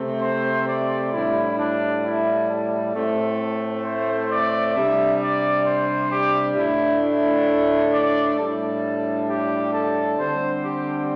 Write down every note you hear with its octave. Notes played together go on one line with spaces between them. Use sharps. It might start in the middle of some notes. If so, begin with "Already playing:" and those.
Already playing: C3 A3 C4
C5
D5
A2 G3 D4 E4
D4
E4
A4
A2 A3 C4
C5
D5
C3 G3 D4 E5
D5
C5
G4
A2 A3 D4 E4
E4
D5
A2 G3 D4 A4
G4
A4
D3 G3 C4 C5
G4